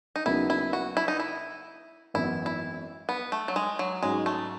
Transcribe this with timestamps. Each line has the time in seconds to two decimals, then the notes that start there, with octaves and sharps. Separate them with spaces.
0.16 D#4
0.26 D#2 C#3 F#3 B3 D#4 E4
0.50 E4
0.73 F#4
0.97 E4
1.08 D#4
1.20 E4
2.14 G#1 F#2 E3 B3 E4
2.46 E4
3.09 B3
3.32 A3
3.48 F#3
3.56 G#3
3.79 F#3
4.02 G#2 F#3 G#3 C#4
4.26 A3